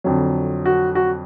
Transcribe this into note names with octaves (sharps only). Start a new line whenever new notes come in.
F2 D3 F#3
F#4
F#4